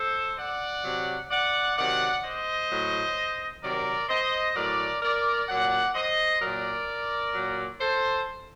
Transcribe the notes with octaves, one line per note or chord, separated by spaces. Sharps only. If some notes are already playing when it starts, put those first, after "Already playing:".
Already playing: A4 C5
D5 F#5
C3 F#3
D5 F#5
C3 D#3 F#3 D5 F#5
C5 D#5
A2 F#3
C3 D#3 F#3 A#4 D5
C5 D#5
A2 F#3 A#4 D5
A#4 D5
A#2 F#3 D5 F#5
C5 D#5
A#2 F#3 A#4 D5
A#2 F#3
A4 C5